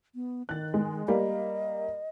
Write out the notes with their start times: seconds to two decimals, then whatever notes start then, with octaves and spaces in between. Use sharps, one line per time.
0.15 B3
0.49 D#3 F#6 A6
0.74 G#3
1.08 G3 A#3 D#5